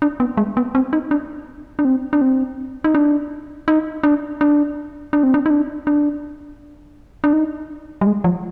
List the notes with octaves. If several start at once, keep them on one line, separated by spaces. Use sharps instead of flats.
D4
B3
G#3
B3
C4
D#4
D4
D4
C4
D4
C4
D#4
D4
D#4
D4
D4
D4
C4
D4
D#4
D4
D4
D4
D#4
G3
G#3
F3